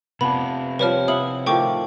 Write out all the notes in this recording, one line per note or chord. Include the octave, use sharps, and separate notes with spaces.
C3 B3 D4 F4 B5
F3 G3 B4 C#5 F6
E4 F5 F#5 D#6 F#7
A2 D#3 F3 G5 C#6 D6